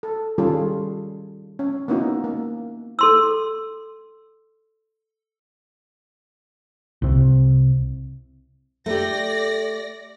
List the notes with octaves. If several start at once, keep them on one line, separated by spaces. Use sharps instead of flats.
A4
D#3 G3 C#4 F4 G#4 A4
C#4
A#3 B3 C#4 D#4 E4 F#4
A#3
A4 C6 E6
C2 C3
A3 G4 D5 A#6